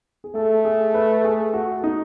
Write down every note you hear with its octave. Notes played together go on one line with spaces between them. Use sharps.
G#4
A3 A4
G#4
B4
G#4
F#4
D#4